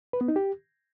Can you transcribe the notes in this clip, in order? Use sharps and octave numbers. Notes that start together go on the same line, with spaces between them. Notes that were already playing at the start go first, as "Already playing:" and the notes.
B4
B3
D#4
G4